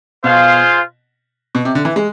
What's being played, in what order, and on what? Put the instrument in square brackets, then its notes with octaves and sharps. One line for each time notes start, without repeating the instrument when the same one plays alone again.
[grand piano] B2 [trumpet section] F4 G#4 C5 F5
[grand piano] B2
C3
D3
E3
G#3